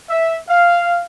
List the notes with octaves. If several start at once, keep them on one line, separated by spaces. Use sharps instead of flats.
E5
F5